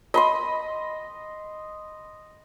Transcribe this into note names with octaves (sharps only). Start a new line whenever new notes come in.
D#5 B5 C6